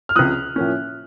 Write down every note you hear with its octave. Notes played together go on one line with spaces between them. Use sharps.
F6
C#2 C3 F3 D#6 F#6
A2 F3 A#3 C#4